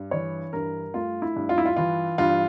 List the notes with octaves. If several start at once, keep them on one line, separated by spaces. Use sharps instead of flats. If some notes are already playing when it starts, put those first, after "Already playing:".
Already playing: G2
E3 C#5
G2 A#4
A3 F4
E4
G2
F4
E4
F4
E3 F4
G2 F4